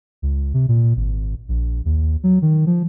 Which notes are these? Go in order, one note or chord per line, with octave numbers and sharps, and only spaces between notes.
C#2
C3
A#2
G#1
A#1
D#2
F#3
D#3
F3